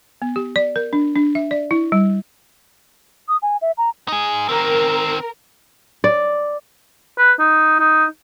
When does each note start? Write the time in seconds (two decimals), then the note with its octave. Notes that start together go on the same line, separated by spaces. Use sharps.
0.22 B3
0.36 G4
0.56 D5
0.76 A#4
0.93 D4
1.16 D4
1.35 E5
1.51 D5
1.71 E4
1.92 G3
3.28 D#6
3.42 G#5
3.62 E5
3.78 A#5
4.08 D#4 G#4
4.49 D#3 C4 A#4
6.04 D5
7.18 B4
7.39 D#4
7.80 D#4